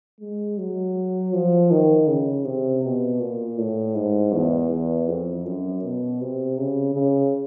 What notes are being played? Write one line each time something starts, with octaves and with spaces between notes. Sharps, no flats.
G#3
F#3
F3
D#3
C#3
C3
B2
A#2
A2
G#2
E2
E2
F2
F#2
B2
C3
C#3
C#3